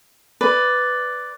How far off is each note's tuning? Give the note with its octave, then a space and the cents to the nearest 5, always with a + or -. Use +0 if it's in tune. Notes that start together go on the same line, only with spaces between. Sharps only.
B4 +10 D5 +0